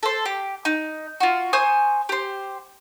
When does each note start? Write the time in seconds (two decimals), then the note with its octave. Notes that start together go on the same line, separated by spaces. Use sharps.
0.03 A4 C5
0.25 G4
0.65 D#4
1.20 F4 F#4
1.53 C5 G#5 C#6 D#6
2.09 G4 C5